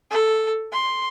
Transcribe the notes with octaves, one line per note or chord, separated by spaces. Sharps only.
A4
C6